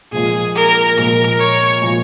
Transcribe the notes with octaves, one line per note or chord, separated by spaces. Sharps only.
A#1 A#2 F3 G#3 G#4
A#4
A#1 A#2 F3 G#3 A#4
C#5
A#2 F3 G#3